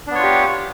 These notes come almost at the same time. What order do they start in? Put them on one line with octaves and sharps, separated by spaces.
D4 B3 C#5 F4 G4